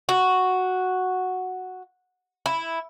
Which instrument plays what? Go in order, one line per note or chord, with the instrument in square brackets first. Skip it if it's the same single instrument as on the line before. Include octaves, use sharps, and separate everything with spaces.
[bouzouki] F#4
E4